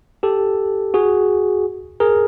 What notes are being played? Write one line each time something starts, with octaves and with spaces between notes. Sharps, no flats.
G4 A4
F#4 G#4
G#4 A#4